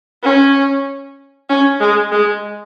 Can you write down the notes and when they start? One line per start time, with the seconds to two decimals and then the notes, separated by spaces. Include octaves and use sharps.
0.24 C#4
1.50 C#4
1.81 G#3
2.12 G#3